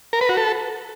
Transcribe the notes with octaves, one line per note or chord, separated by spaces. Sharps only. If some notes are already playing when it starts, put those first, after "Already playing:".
A#4
B4
F#4
A4